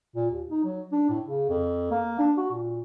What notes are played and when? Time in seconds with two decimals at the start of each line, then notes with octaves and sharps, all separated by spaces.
0.16 A#2
0.31 D#2
0.49 D#4
0.64 F#3
0.92 D4
1.09 A2
1.25 C#3
1.50 F2
1.91 A#3
2.19 D4
2.37 F#4
2.51 A#2